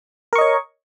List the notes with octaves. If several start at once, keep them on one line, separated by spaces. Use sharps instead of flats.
A#4 C#5 D#5 C#6